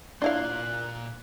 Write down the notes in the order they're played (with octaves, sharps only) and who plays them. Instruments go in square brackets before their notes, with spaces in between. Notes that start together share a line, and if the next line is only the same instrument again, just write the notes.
[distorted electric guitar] A#2 C6 [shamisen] D4 E4 F5 [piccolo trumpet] F#6